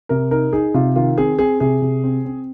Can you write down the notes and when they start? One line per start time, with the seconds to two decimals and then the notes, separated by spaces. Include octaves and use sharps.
0.09 C3 A#4
0.31 D#4 A#4
0.53 D#4 G#4
0.74 C3 F4
0.96 D#3 F4
1.18 C4 G#4
1.39 C4 G#4
1.60 C3 G#4
1.82 C3
2.04 C4
2.25 C4